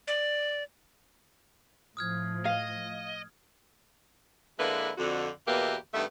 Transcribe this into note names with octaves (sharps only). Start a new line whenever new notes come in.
D5
A2 F3 D#6 F6 G#6
D#5 F5
D3 G#3 A#3 E4 B4
F2 D3 F#4
E2 B2 A#3 G4 B4 E5
G2 D#3 A3 B3 E5